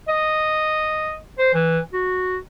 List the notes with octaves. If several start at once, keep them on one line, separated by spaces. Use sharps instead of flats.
D#5
C5
E3
F#4